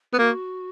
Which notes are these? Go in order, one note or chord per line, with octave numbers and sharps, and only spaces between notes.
B3
A#3 F#4